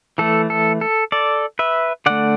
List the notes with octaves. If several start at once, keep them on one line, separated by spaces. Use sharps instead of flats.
E3 A3 A4
A4
A4
A4 D5
B4 E5
D3 A3 D5 F#5